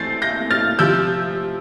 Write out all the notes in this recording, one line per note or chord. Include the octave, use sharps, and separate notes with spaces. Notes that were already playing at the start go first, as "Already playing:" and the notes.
Already playing: E3 A3 C4 G6 A6 C7
G6 A#6
F6 A6
C3 F3 E6 G6